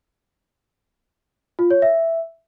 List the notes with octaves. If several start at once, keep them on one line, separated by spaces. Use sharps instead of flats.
F4
C#5
E5